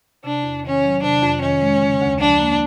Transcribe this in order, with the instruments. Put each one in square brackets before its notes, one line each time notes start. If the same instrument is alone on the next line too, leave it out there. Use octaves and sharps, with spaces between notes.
[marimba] C3 [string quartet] D4
[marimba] E2
[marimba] D#3 [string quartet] C#4
[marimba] F#3
[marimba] C3 [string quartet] D4
[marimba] F2
[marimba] D#3 [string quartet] C#4
[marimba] G#3
C#3
D2
[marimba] F3 [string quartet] D4
[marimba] A#3